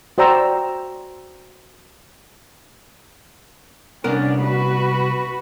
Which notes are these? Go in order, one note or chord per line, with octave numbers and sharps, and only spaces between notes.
F#4 C5 D5 G5 A#5 E6
C2 B3 C#4 D4 A#4
F#4 B4